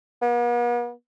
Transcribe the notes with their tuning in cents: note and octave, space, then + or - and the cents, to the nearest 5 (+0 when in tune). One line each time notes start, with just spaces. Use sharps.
B3 -45